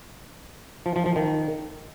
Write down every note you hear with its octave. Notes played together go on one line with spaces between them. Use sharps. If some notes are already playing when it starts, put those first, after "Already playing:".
F3
F3
F3
D#3